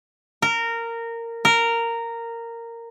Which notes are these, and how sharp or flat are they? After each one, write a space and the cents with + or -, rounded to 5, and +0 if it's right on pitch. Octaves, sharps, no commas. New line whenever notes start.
A#4 -15
A#4 -10